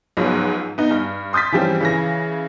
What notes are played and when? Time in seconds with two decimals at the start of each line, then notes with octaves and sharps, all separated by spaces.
0.17 C#2 G#2 F3 F#3 B3
0.78 B3 D#4
0.91 G2
1.33 C6 D#6 G6 A6 B6
1.52 E3 F3 G3 C4 C#4
1.80 C#3 E3 A#6